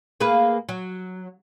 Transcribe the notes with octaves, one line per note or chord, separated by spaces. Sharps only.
A#3 G#4 B4
F#3